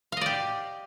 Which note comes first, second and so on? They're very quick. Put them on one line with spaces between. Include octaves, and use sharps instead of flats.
F5 D#5 D5 G4